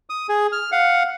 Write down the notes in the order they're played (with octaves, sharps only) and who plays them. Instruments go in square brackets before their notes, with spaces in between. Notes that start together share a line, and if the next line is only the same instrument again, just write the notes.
[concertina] D#6
G#4
F6
F5 F#5